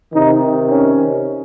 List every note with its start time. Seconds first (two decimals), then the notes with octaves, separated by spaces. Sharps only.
0.12 C3 D#3 D#4
0.69 C#4